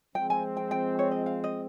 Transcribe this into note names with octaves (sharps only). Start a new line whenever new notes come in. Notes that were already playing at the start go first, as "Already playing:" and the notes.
F3 G#3 C4 G5
G#5
G5
G5
C#5
D#5
F5
D#5